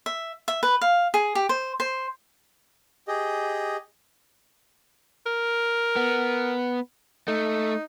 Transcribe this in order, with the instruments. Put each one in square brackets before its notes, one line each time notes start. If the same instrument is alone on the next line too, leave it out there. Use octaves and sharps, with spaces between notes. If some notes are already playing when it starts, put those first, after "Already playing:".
[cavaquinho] E5
E5
B4
F5
G#4
G4
C5
C5
[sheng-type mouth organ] G4 G#4 D#5
[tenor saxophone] A#4
[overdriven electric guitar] B3
[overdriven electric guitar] A3 [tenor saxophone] D#4